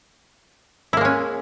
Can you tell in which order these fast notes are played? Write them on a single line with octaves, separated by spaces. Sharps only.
E4 A#3 G#3 C#4